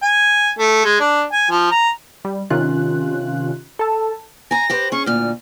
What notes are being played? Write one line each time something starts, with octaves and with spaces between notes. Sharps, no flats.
G#5
A3
G#3
D4
G#5
F3
A#5
G3
C3 D#3 C#4 F4 F#6
A4 A5
G#5 A#5 A#6
G4 B4 C5
C#4 G#4 C#6
D2 A#2 F6